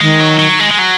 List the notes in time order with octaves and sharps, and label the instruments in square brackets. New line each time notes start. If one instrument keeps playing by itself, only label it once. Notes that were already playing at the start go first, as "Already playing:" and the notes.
[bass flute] D#3 [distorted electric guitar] G#3
[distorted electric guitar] F#3
F#3
G#3
G#3
F#3